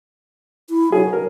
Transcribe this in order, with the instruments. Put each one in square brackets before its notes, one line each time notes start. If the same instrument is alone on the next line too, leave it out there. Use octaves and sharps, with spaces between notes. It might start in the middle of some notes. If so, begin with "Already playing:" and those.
[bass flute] E4
[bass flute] F#3 [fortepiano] G#4
[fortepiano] A#4